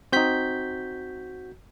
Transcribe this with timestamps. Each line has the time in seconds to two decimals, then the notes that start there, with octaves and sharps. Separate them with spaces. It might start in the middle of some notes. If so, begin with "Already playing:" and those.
0.12 C4 D#4 F#4 G6 B6